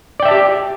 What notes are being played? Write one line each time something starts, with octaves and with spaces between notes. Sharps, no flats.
G4 D5 E5 G5 A5